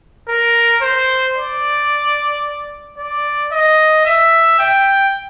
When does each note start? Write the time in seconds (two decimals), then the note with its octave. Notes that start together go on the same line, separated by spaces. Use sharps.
0.28 A#4
0.82 C5
1.36 D5
2.98 D5
3.52 D#5
4.05 E5
4.59 G5